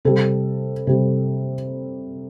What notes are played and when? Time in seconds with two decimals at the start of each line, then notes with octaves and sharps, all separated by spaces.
0.05 C3 G3 A4
0.87 C3 G3